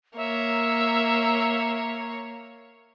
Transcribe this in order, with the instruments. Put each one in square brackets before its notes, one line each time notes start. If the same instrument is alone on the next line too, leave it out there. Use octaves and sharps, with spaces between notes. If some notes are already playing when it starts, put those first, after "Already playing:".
[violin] A#3 C#5 [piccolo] E5